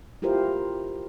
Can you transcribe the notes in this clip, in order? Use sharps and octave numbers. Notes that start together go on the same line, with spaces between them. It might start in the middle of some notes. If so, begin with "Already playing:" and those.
E4 F4 G4 A#4 C5